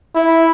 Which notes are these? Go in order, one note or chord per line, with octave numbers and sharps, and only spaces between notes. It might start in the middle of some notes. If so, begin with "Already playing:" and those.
E4